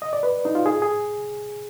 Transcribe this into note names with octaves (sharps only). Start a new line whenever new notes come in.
D#5
D5
B4
D#4
F4
G#4
G#4